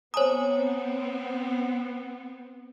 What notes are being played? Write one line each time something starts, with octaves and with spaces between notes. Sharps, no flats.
B3 C4 C5 C#5 G#5 A#5 D#6